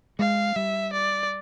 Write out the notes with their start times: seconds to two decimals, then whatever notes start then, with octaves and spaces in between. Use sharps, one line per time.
0.19 G#3 F5
0.56 G3 E5
0.93 D5